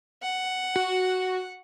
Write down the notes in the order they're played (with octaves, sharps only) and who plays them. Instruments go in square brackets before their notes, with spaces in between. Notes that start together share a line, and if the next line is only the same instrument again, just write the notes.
[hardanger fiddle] F#5
[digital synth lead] F#4